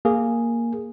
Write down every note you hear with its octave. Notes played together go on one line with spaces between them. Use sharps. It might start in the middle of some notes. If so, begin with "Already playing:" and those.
A#3 G#4